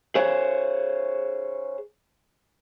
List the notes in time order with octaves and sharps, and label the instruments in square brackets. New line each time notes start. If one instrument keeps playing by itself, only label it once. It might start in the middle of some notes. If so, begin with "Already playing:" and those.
[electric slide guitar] G#4 C5 C#5